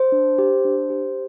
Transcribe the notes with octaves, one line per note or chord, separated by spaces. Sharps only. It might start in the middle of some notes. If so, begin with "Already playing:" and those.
Already playing: C5
D4
G4
D4
G4